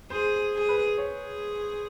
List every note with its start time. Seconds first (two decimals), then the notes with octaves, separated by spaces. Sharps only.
0.10 G#4 C5
0.54 G#4
0.69 B4
0.97 G#4 C#5